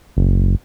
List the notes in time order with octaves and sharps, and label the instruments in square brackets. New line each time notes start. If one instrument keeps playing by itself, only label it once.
[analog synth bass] F#1